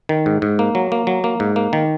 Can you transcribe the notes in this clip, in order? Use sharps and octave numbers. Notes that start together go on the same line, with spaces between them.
D#3
G#2
G#2
A#3
F#3
A#3
F#3
A#3
G#2
A#3
D#3